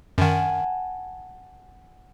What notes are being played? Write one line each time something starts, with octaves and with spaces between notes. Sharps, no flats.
F#2 D#3 F#5 G#5 A5